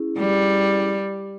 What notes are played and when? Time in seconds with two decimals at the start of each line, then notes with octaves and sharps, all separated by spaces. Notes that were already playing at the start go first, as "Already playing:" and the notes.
Already playing: C#4 E4 G#4
0.18 G3